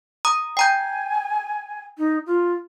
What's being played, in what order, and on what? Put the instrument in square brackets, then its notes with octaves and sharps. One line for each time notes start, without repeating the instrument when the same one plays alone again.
[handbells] A#5 D#6
[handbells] G5 A#5 G6 [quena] G#5
[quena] D#4
F4